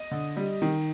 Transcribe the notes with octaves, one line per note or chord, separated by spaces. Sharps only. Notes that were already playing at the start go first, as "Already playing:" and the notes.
Already playing: D#5
D3
G3
D#3